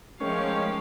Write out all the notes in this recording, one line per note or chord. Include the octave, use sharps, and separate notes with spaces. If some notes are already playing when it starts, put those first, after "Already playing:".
D#3 F3 G#3 A3 C#4 G4 F5 G5